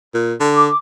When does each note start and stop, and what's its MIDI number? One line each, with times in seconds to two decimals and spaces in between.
0.14 0.34 46
0.40 0.69 50
0.56 0.76 86